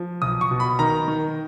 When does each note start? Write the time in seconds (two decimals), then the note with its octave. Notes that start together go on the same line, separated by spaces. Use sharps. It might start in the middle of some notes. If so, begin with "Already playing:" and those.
Already playing: F3
0.22 B1 D#6
0.41 C#6
0.51 B2
0.60 B5
0.79 D#3 A#5
1.08 D#3